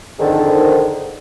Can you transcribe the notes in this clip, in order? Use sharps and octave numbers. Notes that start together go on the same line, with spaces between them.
F2 G#2 D3 D#3